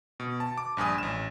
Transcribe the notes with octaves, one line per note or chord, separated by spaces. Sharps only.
B2
A5
D6
A#1 G2 G#5 D#6
A1 E7